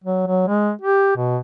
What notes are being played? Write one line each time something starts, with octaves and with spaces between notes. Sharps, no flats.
F#3
F#3
G#3
G4
B2